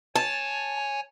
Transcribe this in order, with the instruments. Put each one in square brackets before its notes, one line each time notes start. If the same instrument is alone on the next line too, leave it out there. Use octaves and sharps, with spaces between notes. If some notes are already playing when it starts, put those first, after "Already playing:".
[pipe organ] C#5 G#5 [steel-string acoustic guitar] A5